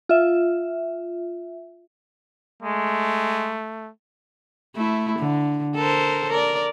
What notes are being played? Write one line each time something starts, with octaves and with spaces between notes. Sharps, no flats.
F4 E5
G#3 A3
A3 E4
D3
A4 A#4 C5
A#4 D5